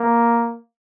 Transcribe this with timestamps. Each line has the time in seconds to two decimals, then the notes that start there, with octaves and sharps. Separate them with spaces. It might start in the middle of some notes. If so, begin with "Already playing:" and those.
Already playing: A#3